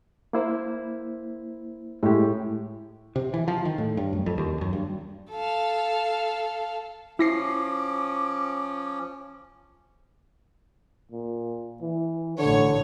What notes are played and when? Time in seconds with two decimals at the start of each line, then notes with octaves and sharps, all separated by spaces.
0.33 A#3 E4 C5
2.03 A2 G#3 G4
3.16 C3
3.34 E3
3.48 F3
3.65 D#3
3.78 A2
3.97 G2
4.13 F#2
4.26 F2
4.38 D#2
4.61 F#2
4.73 G2
5.31 A4 F5
7.19 F3 C#4 E4 D6 A#6 C7
11.11 A#2
11.81 E3
12.38 A1 D3 C#5